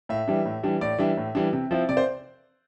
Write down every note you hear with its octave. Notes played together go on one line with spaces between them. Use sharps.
A2 E5
E3 G3 D4
A2
E3 G3 D4
A2 D5
E3 G3 D4 E5
A2
E3 G3 D4
C3
F3 C4 E4
C3 D5
C5